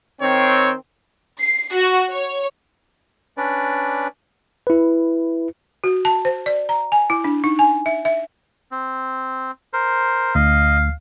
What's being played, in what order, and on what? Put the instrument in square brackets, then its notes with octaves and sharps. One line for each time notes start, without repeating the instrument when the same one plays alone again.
[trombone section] D#3 C4 [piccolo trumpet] C#5
[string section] C7
F#4
C#5
[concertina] C#4 D4 B4 D5
[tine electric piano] E4 B4
[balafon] F#4
A5
C5
D5
A#5
G#5
E4
D4
D#4
G#5
E5
E5
[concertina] C4
A#4 C5
[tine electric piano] D2 [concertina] D#5 [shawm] F5